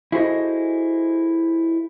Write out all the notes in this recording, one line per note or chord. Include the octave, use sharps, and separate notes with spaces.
E4 F#4 G#4 A4 C5 D#5